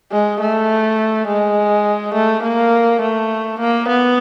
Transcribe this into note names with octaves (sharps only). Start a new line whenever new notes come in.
G#3
A3
G#3
A3
A#3
A3
A#3
B3